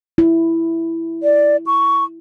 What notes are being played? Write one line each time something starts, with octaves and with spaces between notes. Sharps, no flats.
E4
D5
C#6